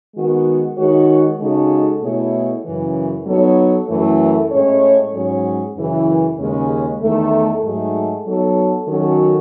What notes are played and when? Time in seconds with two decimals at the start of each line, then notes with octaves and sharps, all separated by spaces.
0.15 D#3 G#3 B3 F#4
0.76 D#3 G#3 D#4 F#4 C#5
1.38 C#3 G#3 D#4 F#4 A4
2.01 B2 A3 E4 G#4 C#5
2.63 F#2 C#3 E3
3.26 F#3 B3 D#4 A4 C#5
3.88 F#2 E3 A3
4.50 A2 G#3 C#4 G#4 C#5
5.12 G#2 F#3 C#4 G#4 C#5
5.75 F#2 C#3 E3
6.38 D#2 C#3 G#3 C#4
7.00 E2 D#3 A3
7.62 G#2 F#3 A3 D#4 G#4
8.25 F#3 B3 D#4 A4 C#5
8.86 D#3 F#3 C#4 F#4 A4